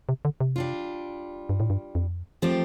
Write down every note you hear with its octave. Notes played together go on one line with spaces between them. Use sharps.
C3
D3
C3
G3 D4 F4
G2
A2
G2
F2
F3 A3 C4 G4